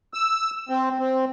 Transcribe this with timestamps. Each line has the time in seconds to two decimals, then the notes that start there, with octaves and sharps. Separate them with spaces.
0.14 E6
0.69 C4
0.99 C4